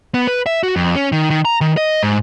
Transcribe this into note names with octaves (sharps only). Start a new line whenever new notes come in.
B3
B4
E5
F#4
F2
C#4
D#3
D#3
A#5
D#3
D#5
G#2